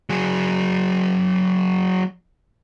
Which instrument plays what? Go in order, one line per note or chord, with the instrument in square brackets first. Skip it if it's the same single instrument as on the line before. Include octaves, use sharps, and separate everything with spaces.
[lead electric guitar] F#3 G#4